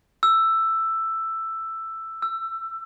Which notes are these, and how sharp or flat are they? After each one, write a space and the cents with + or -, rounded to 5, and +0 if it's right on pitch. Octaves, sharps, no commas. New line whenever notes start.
E6 +10
E6 +20